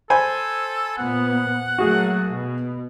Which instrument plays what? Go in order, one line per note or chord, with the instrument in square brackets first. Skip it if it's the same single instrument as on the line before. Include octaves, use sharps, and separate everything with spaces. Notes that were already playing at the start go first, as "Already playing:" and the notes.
[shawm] A4 [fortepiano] C5 G#5 B5
[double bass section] A#2 B3 [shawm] F#5
[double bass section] F#3 A3 A#3 [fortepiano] F#4 G#4
[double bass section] B2